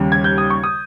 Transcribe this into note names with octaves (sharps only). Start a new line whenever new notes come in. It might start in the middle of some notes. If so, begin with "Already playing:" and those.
Already playing: D#2 C#3 G3
G#6
G6
D#6
C#6
D#6